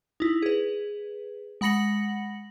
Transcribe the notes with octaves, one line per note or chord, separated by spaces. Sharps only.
D#4 E4
G#4 B4
G#3 F#5 B5 A#6 C#7 F#7